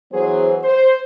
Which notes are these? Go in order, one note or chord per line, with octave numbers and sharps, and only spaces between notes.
E3 F#3 B3 G#4 C5
C5